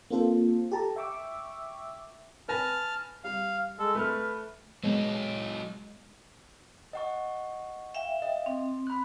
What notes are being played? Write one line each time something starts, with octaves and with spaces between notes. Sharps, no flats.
A#3 C4 F4 A4 C5
G4 A4 A5 A#5
E5 G5 C#6 D6 E6
B4 G#5 A5 F6 A#6
G3 F5
G#3 A4
A3 B4 F6
F#3 G#3 B3 C#5 D#5
D#5 F#5 C#6
E5 F5 G5
D#5
C4
B5 F#6